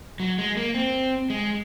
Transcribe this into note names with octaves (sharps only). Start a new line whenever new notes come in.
F#3
G#3
A#3
C4
G#3